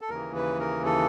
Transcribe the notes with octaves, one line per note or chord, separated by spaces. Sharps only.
A4
D#2 C#3 E3 A#4
B4
A#4
A4